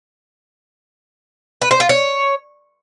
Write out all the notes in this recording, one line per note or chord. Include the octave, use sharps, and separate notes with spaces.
B4
C5
F4
C#5